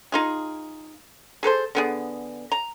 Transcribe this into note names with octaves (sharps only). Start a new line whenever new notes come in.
D#4 F4 G#4
G#4 A4 B4 C5
D3 B3 G#4
A#5